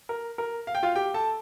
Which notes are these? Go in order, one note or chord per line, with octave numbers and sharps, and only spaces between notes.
A#4
A#4
F5
G5
F4 F5
G4 G5
A4 A5